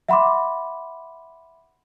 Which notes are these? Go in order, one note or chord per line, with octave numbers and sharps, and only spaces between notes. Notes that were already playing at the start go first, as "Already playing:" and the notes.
E5 F#5 B5 C6 D6